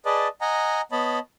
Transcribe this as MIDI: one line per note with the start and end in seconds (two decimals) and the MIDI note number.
0.06 0.28 68
0.06 0.28 71
0.06 0.28 74
0.06 0.28 75
0.06 0.28 81
0.41 0.81 75
0.41 0.81 78
0.41 0.81 80
0.41 0.81 82
0.92 1.19 59
0.92 1.19 73
0.92 1.19 75
0.92 1.19 81
0.92 1.19 83